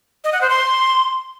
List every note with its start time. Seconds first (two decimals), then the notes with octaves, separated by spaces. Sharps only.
0.24 D#5
0.33 F#5
0.41 C5
0.50 C6